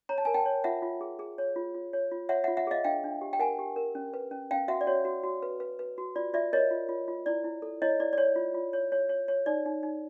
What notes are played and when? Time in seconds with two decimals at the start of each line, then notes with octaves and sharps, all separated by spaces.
0.09 C#5 A#5
0.18 A5
0.25 A#4 G#5
0.34 G5 A5
0.46 C#5
0.64 F4 E5 F#5
0.82 F4
1.01 G#4
1.19 G#4
1.38 C#5
1.56 F4
1.74 F4
1.93 C#5
2.11 F4
2.29 C#5 E5 F#5
2.44 F4 E5 F#5
2.57 E5 F#5
2.67 G#4 D#5 F5
2.84 D4 F5 G5
3.04 D4
3.21 G4
3.33 G5
3.39 A#4 F#5 G#5
3.59 G4
3.76 A#4
3.95 C#4
4.14 B4
4.31 C#4
4.51 C#4 F5 G5
4.68 F#4 E5 F#5
4.81 D5
4.87 F#4 C#5
5.05 F#4
5.23 F#4
5.42 B4
5.60 B4
5.79 B4
5.98 F#4
6.16 F4 D5
6.34 F4 D5 E5
6.53 A#4 C#5 D#5
6.71 F4
6.89 F4
7.08 F4
7.26 E4 D5
7.44 E4
7.62 A4
7.82 E4 C#5 D#5
8.00 E4 D5
8.13 D5
8.18 C#5
8.36 F4
8.54 F4
8.73 C#5
8.92 C#5
9.09 C#5
9.28 C#5
9.46 D#4 D5
9.66 D#4
9.83 D#4